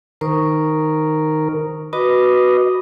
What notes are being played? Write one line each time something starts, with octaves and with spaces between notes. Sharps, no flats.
D#3 A#4 C5 C#6 D#6
F#4 B4 D#5 D6